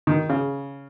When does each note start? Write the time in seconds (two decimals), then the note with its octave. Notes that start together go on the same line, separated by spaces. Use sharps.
0.07 D#3
0.29 C#3